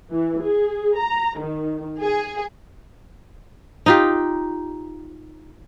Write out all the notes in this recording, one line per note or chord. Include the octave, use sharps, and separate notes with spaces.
E3
G#4
A#5
D#3
G#4
D#4 F4 G4